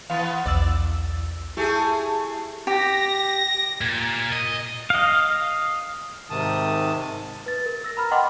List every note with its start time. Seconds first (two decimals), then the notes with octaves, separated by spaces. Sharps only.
0.10 E3 B3 F5
0.46 B1 E2 D5 E6
1.57 A3 E4 G4 G#4
2.67 G4 A#6
3.81 A#2
4.33 D#5
4.90 D#5 F5
6.30 G#2 C3 D#3 A5 D#6
7.46 B4 A6
7.66 A#4
7.84 E6 A#6
7.97 A#5 B5 F6
8.11 D#5 F#5 G5 B5 C6 D6